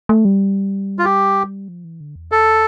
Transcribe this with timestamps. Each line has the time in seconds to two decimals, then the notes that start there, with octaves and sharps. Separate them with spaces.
0.09 A3
0.25 G3
0.99 F4
1.05 G4
1.68 F3
1.84 E3
2.00 D3
2.16 E2
2.32 F2 A4